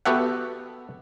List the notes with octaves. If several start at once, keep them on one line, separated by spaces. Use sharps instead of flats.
B3 F#4 G4 A4 E5 F#5